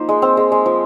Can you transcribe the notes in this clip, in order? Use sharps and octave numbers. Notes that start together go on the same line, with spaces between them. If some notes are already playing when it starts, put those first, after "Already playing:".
Already playing: F3 A#3 D#4 C5
G#3
C4
G#3
G#3
F3